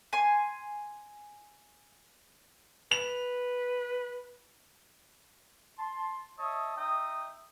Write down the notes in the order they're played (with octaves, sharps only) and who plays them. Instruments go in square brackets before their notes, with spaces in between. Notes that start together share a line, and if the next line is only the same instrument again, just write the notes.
[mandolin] G#5 C6
[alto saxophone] B4 [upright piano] F7
[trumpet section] A5 C6
C#5 D#5 E5 A5 D#6
D#4 D#5 E5 G5 D#6